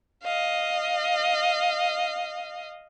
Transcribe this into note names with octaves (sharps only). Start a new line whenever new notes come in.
D#5 F5